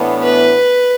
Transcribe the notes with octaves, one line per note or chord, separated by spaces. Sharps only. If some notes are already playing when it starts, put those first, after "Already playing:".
Already playing: A2 E3 B3 D4
B4